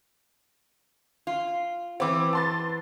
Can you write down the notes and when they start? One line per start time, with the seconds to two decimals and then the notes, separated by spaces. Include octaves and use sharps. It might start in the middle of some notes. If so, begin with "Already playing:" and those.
1.27 F4
2.00 E3 B3 C4 D6
2.33 A5 C6 A6